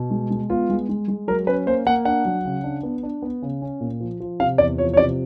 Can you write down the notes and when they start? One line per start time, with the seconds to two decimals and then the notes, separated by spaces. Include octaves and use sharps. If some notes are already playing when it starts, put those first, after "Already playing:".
Already playing: B2
0.11 G#3
0.30 G#3
0.50 B3 F4
0.70 G#3
0.89 G#3
1.08 G#3
1.28 F#3 A#4
1.47 C#4 B4
1.66 A#3 C5
1.87 A#3 F#5
2.05 D4 F#5
2.25 F#3
2.45 C#3
2.64 D4
2.83 B3
3.03 D4
3.22 B3
3.42 C#3
3.62 C#4
3.80 A#2
4.00 F3
4.20 F3
4.40 C3 F5
4.58 E2 D5
4.78 F3 C#5
4.94 C#5
4.97 C3 D5